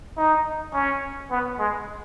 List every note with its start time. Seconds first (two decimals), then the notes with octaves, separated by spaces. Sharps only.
0.17 D#4
0.74 C#4
1.31 B3
1.59 G#3